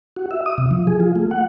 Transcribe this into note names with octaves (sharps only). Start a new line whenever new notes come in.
F#4
E5
D#6
C3
F3
G#4
F4
A3
F#5